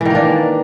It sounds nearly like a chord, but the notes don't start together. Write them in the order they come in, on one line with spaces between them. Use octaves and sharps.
E3 D#3 A#3 D4